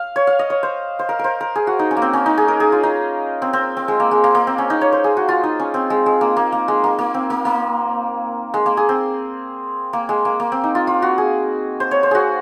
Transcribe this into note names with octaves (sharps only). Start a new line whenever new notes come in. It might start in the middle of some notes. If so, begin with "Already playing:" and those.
Already playing: F5
C#5
F5
D#5
C#5
C5
C5
A#4
A#4 C5
A#4
G#4
F#4
D#4
C#4
A#3
C4
C#4
D#4
G#4
A#4
G#4
F4
D#4
C4
C4
C4
G#3
A#3
G#3
A#3
A#3
C4
C#4
D#4
C#5
C5
G#4
F#4
F4
D#4
C#4
C4
G#3
G#3
A#3
A#3
A#3
G#3
A#3
A#3
C4
A#3
A#3
G#3
A#3
G#4
C4
A#3
G#3
A#3
A#3
C4
D#4
F4
F4
F#4
G#4
C5
C#5
C5
F#4 G#4